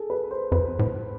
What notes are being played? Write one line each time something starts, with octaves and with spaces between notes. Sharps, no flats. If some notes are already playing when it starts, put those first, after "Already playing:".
Already playing: G#4 A4
B4
C5
F2 B4
A2